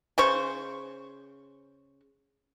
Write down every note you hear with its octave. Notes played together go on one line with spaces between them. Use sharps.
C#3 C5 C#6